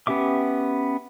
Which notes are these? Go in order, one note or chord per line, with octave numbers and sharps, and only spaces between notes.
B3 C#4 G4 E5 D6